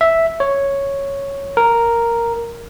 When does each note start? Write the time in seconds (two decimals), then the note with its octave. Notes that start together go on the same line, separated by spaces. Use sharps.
0.01 E5
0.40 C#5
1.57 A#4